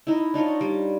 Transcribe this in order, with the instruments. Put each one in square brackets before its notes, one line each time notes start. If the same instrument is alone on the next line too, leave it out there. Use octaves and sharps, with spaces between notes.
[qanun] D#4 E4
D4 D#4 F4 C#5
G3